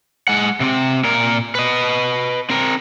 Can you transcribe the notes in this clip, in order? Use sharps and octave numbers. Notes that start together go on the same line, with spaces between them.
G#3 F#5
C3 C4
A#2 A#4
B4 D#5
C4 A#4